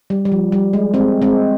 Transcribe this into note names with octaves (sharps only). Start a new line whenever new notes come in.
G3
G3
F3
G3
G#3
G#3 C4
G#3 C4